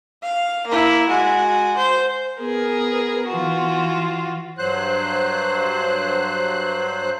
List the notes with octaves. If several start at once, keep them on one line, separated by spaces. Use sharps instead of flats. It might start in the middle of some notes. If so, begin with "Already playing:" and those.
F5
A#3 E4
G#3 F#4
C5
B3 G#4 A#4
E3 F4 F#4
G2 F#3 C5 F#6